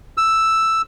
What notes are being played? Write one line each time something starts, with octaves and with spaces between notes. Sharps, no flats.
E6